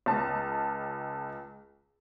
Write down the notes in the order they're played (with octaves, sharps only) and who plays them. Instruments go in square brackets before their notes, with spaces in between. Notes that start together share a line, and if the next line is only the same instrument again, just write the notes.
[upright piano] C#2 A5